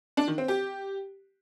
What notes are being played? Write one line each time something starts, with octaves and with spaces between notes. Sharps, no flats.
D4
D#3
C4
G4